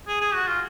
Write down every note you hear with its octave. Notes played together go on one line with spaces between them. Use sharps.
G#4
G#4
F#4
F4